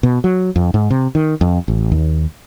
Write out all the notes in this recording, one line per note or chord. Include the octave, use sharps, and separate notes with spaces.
B2
F#3
F2
G#2
C3
D#3
F2
A1
D#2